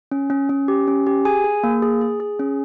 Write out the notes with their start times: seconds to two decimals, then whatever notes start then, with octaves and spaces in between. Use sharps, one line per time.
0.11 C#4
0.30 C#4
0.49 C#4
0.68 G4
0.88 C#4
1.07 G4
1.25 G#4 G#5
1.44 G#4
1.64 A#3
1.82 G#4
2.01 G#4
2.20 G#4
2.40 C#4